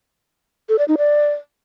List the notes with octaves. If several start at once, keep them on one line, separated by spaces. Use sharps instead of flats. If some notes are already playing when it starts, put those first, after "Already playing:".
A4
D5
D#4
D5